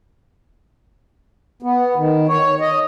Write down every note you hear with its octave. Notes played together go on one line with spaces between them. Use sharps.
B3
D#3
C#5
D#5